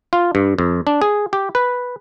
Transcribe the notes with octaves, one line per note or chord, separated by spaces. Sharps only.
F4
G2
F2
D4
G#4
G4
B4